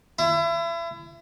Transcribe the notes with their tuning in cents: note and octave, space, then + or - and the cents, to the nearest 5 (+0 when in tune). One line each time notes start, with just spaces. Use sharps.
E4 +35